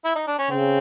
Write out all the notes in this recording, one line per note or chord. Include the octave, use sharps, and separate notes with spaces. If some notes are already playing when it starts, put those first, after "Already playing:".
E4
D#4
D4
C#4
C#3 C4